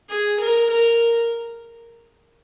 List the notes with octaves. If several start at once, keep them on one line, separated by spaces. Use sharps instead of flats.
G#4
A#4
A#4